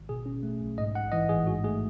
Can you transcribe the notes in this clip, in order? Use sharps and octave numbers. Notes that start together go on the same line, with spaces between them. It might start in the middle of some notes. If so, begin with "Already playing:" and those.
Already playing: G#1
B2 G#4
C#4
A3
B1
G#2 D#5
A1 F#5
E3 D#5
A1 G#4
G#2 F#4
A3 G#4